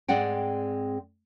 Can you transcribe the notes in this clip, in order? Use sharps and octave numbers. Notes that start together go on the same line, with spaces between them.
G#2 G#3 C4 D5 F#5 G5